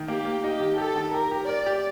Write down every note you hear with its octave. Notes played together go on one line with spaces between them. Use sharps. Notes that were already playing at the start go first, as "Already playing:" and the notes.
Already playing: D#3
A#3 G4
A#3
D#4 G4
D#3
G4 A4
D#3
G4 A#4
G4
A#4 D5
G4